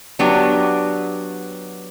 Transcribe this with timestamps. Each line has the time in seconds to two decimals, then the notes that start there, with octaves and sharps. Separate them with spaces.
0.19 F#3 B3 D4 G4